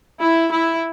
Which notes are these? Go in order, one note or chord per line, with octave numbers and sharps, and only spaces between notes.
E4
E4